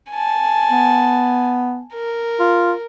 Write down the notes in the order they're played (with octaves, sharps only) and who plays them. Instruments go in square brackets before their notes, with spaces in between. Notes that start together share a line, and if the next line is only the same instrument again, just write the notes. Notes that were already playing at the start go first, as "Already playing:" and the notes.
[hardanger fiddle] G#5 A5
[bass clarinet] B3
[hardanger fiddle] A#4
[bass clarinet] F4